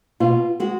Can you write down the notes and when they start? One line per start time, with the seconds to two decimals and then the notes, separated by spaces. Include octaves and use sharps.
0.20 B2 F4
0.60 G#3 F#4